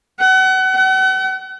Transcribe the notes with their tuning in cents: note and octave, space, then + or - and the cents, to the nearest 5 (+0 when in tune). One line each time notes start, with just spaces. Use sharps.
F#5 +30
F#5 +40